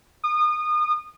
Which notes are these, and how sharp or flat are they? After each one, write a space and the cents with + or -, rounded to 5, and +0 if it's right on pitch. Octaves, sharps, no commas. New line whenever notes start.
D#6 -30